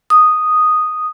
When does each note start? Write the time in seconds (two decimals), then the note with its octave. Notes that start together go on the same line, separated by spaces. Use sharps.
0.10 D#6